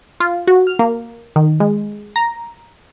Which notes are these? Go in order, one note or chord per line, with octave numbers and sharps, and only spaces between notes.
F4
F#4
F6
A#3
D#3
G#3
A#5